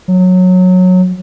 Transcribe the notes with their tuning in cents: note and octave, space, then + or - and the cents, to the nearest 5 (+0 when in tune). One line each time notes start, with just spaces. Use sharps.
F#3 -15